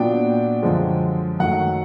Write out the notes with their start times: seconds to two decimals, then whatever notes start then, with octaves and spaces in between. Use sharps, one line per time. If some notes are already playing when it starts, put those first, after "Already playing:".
Already playing: A#2 F#3 B3 D4 G5
0.63 F#2 D3 F3 G#3
1.39 F#2 D#3 F#3 A3 F#5